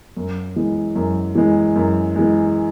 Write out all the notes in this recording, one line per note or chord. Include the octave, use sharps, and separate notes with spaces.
F#2
E3 G#3
F#2
E3 G#3
F#2
E3 G#3